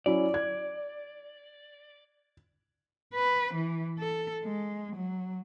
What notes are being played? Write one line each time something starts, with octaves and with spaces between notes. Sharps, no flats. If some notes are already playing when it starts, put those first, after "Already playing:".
F#3 C#4 E4 D5
G#6
B4
E3
A4
G#3
F#3